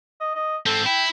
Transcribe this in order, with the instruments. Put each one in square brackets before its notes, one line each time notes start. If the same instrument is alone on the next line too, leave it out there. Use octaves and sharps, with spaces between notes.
[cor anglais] D#5
D#5
[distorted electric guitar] G#2 C4 [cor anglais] A4
[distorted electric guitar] E4 [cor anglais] G5